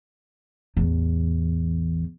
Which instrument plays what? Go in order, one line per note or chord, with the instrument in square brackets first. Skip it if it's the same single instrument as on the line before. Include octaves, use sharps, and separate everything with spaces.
[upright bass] A1 E2